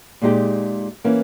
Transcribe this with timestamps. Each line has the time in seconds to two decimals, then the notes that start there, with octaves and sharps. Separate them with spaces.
0.22 A#2 G#3 D#4 G4
1.04 E3 A#3 C#4 E4